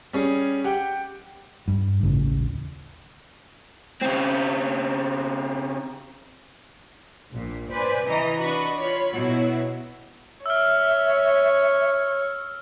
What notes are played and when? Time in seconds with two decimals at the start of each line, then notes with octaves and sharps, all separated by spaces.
0.13 G3 C#4 G#4
0.64 G4 F#5 G5
1.68 G2
2.03 D#1 A1 C#3
4.01 C#3 C4
7.32 A#1 A#2
7.70 B4 C5 D5 G#5
8.06 C3 E3 D#5 A#5
8.38 D4 F#4 B4 D#5 B5 C#6
8.79 F4 C#5 B5
9.13 B2 F#3 E4 F#4
10.46 C#5 E5 E6 F6